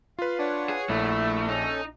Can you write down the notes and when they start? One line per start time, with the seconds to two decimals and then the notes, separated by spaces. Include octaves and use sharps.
0.19 F4 B4 F5
0.39 D4 C#5 F#5
0.69 G#4
0.89 A#1 A3 E4
1.49 C#4 D#4 A4